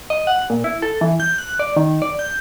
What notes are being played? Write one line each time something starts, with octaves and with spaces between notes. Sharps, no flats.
D#5
F#5
A#2
E4
A4
E3
G6
F#6
D5
D#3
D5
G6